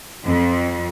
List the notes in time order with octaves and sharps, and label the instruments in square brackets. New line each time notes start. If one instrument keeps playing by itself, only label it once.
[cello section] F2